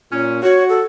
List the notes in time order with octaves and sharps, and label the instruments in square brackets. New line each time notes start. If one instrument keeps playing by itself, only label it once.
[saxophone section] A#2 C#4
[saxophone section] F#4 [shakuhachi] C#5
[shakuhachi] A4